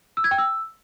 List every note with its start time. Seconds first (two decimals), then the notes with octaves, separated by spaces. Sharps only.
0.17 E6
0.24 G#6
0.31 G5
0.38 E6